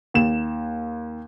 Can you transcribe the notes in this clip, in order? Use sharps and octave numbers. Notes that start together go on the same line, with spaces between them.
D#2 E7